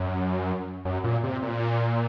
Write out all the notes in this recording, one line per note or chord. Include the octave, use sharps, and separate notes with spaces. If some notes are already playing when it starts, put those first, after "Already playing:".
Already playing: F#2
F#2
A#2
C3
A#2